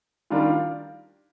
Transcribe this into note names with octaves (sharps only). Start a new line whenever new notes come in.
D#3 G3 D4 F4 A#4